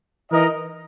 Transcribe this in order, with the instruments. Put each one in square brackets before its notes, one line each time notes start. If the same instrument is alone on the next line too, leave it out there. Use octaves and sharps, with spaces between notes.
[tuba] E3 [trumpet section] D#4 A#4 D#5